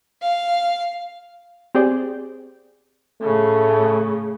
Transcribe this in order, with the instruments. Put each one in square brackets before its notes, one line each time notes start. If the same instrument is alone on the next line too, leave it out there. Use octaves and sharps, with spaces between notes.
[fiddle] F5
[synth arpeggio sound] C4 G4 G#4 C5 D5
[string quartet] A2 C#3 [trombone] A3